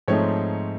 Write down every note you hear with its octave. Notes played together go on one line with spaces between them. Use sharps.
G#2 F3 A3 C4 D#4 C#5